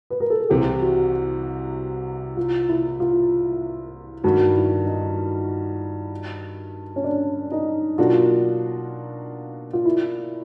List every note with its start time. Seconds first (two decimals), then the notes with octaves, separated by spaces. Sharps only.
0.10 B4
0.20 A#4
0.30 A4
0.40 G#4
0.50 C2 C3 E3 G4
0.81 F#4
2.37 F4
2.69 E4
3.00 F4
4.24 G2 D#3 G3 F#4
4.56 E4
4.86 D#4
6.96 C#4
7.04 D4
7.52 D#4
7.98 B2 F#3 A#3 D4 F4 F#4
9.73 F4
9.86 E4